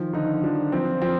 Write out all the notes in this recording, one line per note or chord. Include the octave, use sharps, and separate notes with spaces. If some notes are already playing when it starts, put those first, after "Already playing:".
Already playing: D#3 F3
D3 D#4
F3 D4
F3 C4
F3 C4